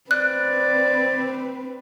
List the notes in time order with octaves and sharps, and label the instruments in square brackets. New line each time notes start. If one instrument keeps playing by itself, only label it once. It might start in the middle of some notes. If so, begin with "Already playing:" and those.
[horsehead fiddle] C4 B4 [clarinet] D5 [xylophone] F#6